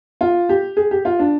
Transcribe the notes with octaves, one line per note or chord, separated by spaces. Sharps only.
F4
G4
G#4
G4
F4
D4